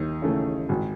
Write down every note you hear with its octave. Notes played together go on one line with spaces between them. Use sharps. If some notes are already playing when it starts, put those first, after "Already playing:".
Already playing: D#2 D#4
C#3 E3 A3
G#1